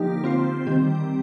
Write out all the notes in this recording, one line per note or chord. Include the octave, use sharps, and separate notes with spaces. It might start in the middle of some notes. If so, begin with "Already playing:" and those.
Already playing: D3 F3 A#3 D#4 G4
C4 F4 C5
D#3 G3 C4 G4